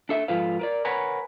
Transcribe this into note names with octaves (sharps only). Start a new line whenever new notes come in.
D4 A4 E5
G#2 F3 F4 A4 B4 F5
A#4 B4 D5
A#4 B4 C#5 F#5 G#5 A#5